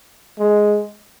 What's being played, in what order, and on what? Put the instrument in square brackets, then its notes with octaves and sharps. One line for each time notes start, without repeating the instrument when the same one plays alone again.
[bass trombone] G#3